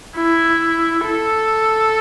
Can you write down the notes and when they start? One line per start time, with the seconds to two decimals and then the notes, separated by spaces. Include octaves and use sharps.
0.16 E4
1.06 A4